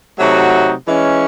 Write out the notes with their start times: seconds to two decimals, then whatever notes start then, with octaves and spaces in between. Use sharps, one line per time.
0.19 C3 F#3 A3 D#4 F#4
0.87 E3 G#3 C#4